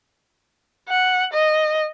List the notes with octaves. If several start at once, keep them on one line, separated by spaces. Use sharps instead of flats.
F#5
D#5